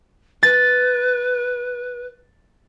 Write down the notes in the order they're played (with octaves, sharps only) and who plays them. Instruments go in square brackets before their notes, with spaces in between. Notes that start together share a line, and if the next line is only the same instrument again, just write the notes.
[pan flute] B4 [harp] A6